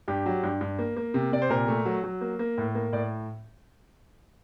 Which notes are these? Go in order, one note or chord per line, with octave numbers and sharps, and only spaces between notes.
G2 G4
F#3
G2
G2
A#3
A#3
C3
C3 D5
C5
A#2 A#4
A3
F#3
F#3
A#3
A#3
A2
A#3
A2 D5